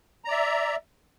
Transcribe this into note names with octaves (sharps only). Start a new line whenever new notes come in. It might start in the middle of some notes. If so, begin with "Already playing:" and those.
D5 E5 A#5